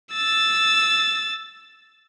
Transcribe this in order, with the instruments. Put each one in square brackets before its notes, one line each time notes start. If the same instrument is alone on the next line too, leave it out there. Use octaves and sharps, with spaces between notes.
[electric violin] E6 A6